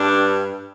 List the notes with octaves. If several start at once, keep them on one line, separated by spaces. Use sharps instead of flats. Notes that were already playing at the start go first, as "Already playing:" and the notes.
Already playing: G2 D4